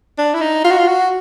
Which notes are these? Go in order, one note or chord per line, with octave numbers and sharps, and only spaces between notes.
D4
E4
D#4
F4
F#4
F4
F#4